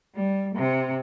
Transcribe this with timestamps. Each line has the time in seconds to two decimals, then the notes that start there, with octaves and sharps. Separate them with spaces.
0.15 G3
0.55 C3